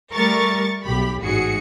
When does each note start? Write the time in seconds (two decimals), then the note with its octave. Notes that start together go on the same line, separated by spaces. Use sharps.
0.13 G3 A3 A#4 C#6 A6
0.84 B1 G4 B5
1.21 A1 G#2 F#4 G#4 C#7